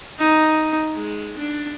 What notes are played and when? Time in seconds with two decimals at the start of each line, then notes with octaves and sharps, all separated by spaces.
0.19 D#4
0.93 G#3
1.37 D4